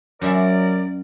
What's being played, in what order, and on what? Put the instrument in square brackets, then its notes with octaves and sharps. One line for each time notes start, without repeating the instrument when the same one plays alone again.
[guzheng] F#2 E5 [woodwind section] F#3 A#4 D5